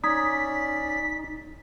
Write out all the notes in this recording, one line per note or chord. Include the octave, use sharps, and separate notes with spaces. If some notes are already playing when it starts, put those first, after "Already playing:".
C#4 D#4 D5 D#6 G#6 B6